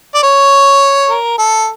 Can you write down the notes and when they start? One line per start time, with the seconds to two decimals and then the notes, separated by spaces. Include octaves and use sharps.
0.15 D5
0.23 C#5
1.09 A#4
1.38 A4